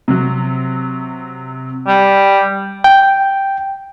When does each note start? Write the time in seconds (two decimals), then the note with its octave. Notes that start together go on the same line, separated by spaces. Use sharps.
0.08 C3 F#3
1.87 G3
2.84 G5